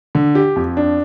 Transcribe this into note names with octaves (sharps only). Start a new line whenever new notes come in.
D3
G4
F2
D4